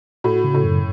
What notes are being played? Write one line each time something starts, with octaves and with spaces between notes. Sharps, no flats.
A2 F#4
C#3
A2
F#2